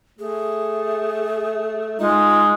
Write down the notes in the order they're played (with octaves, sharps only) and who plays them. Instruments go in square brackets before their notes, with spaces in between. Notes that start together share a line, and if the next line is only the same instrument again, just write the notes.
[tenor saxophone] A3 [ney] G#4
[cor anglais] G#3 [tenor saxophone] D#4 [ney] F4